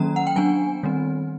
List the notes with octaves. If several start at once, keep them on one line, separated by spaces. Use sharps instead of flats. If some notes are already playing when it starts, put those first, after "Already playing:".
Already playing: D#3 F#3 A#3 C#4 A#5
F#5
G5
F#3 B3 D4 G#5
D#3 G3 C4